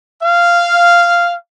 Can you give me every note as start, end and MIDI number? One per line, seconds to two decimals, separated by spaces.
0.23 1.36 77